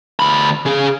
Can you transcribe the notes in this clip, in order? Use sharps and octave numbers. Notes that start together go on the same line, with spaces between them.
D2 B5
C#3 G#4